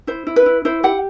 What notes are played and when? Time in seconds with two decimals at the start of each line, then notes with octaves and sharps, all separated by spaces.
0.07 E4 C5
0.27 E4
0.36 B4
0.46 E4
0.65 E4 C5
0.83 G4 F#5